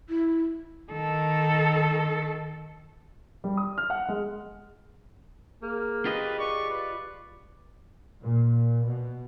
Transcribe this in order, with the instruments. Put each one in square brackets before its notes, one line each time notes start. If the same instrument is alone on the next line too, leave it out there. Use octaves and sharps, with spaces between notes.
[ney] E4
[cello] D#3 A4
[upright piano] G3
D#6
F6
F#5
G#3
[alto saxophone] A#3 [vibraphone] G#4
[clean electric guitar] F4 G4 D#5 [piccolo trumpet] B4
[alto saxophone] D5 [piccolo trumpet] C#6
[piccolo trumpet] B4
[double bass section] A#2
B2